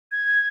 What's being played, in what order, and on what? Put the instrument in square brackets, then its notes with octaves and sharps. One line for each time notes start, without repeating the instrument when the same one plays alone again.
[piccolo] G#6